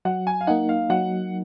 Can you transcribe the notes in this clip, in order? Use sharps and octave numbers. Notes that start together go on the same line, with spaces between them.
F#3 F#5
G#5
F5
A#3 D#4 F#5
F5
F#3 F#5